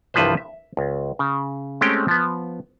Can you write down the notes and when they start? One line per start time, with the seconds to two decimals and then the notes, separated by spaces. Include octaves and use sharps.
0.14 C2 G2 E3 F3 B4 C5
0.37 E5
0.77 C#2
1.19 C#3
1.81 G#3 A3 C4 C#4 G4 G5
2.08 F3 B3